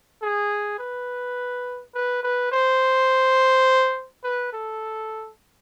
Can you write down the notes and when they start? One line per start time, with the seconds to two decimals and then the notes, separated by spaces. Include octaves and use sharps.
0.22 G#4
0.79 B4
1.95 B4
2.23 B4
2.52 C5
4.24 B4
4.53 A4